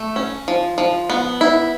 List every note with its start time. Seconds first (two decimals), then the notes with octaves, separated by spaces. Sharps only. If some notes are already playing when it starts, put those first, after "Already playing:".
Already playing: A3
0.16 C#4
0.48 F3
0.78 F3
1.10 B3
1.41 E4